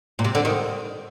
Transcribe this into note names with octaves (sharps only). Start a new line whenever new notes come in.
A#2
C3
D3
D#3